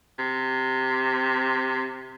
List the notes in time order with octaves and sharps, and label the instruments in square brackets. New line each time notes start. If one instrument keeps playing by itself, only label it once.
[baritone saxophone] C3